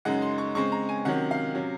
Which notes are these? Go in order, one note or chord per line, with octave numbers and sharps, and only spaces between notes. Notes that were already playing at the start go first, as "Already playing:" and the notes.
F#2 C#3 G#3 D#4 F#5
C6
C#6
C#3 G#3 C4 C#6
A#5
G#5
C3 D#3 F#3 C#4 F#5
F5
C3 F#3 C#4